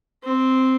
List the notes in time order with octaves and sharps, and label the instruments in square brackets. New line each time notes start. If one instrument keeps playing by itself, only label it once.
[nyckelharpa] C4